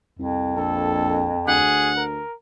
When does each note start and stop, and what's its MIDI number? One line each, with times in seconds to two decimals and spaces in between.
0.19 0.55 36
0.19 1.63 41
0.56 1.37 34
0.56 1.21 69
1.47 2.21 38
1.47 1.92 68
1.47 2.03 78
1.97 2.34 70